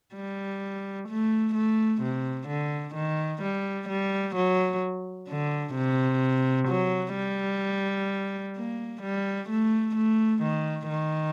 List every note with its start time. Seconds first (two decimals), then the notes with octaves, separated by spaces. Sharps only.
0.15 G3
1.09 A3
1.55 A3
2.02 C3
2.48 D3
2.95 D#3
3.42 G3
3.89 G3
4.36 F#3
5.29 D3
5.76 C3
6.69 F#3
7.15 G3
8.56 A#3
9.02 G3
9.50 A3
9.96 A3
10.43 D#3
10.89 D#3